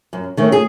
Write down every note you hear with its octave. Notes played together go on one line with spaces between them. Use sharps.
F#2
D#3 A3 C#4
G#4